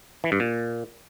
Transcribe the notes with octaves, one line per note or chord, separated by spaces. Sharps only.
E3
G2
A#2